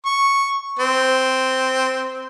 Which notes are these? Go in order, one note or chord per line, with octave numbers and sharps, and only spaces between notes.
C#6
C4